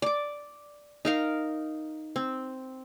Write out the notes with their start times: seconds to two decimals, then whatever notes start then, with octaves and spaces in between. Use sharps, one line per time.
0.02 D5 D6
1.05 D#4 A#4 F5
2.16 C4